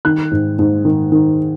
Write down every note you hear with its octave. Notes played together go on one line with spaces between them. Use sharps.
D#3 F#6
G#2
G#2
D#3
D#3